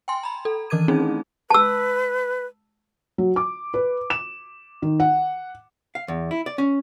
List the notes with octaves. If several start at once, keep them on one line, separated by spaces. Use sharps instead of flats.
G5 G#5 C6
A#5 B5
A4
D#3 E3 A#4 D6 G#6 D#7
A3 C4 C#4 D#4 E4 G#4
B4 A5 E6
F#3
D6
B4
E7
D#3
F#5
F5
E2
E4
D5
C#4